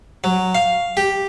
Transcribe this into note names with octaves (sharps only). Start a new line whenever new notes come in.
F#3
F5
G4